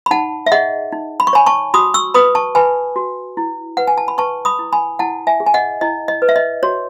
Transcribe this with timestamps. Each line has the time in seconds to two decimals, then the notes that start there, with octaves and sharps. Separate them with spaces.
0.06 B5
0.11 D#4 F#5 A5
0.46 E5
0.52 G#4 D#5 F#5
0.92 D#4
1.20 B5
1.27 C#6
1.33 C#5 G#5 B5
1.46 A5 C#6
1.74 F#4 B5 D#6
1.94 C#6 E6
2.14 B4 B5 D#6
2.35 A5 C#6
2.55 B4 G#5 B5
2.96 F#4
3.37 E4
3.77 B4 F#5
3.87 G#5
3.98 A5
4.08 B5
4.18 B4 A5 C#6
4.45 B5 D#6
4.59 E4
4.73 G#5 B5
4.99 E4 F#5 A5
5.27 E5 G#5
5.40 G#4
5.46 G#5
5.54 D#5 F#5
5.81 E4 D#5
6.08 D#5
6.22 B4
6.29 E5
6.36 D#5
6.63 F#4 C#5